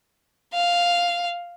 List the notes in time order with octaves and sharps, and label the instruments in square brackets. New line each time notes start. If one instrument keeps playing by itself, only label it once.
[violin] F5